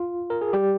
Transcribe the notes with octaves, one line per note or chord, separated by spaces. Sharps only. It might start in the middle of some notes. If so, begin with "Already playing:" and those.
Already playing: F4
A#4
G#4
G3 G4